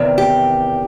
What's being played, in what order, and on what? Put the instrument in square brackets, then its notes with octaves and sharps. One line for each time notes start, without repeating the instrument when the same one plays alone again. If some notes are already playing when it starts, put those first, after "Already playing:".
Already playing: [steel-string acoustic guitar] E2 C3 D#3
G4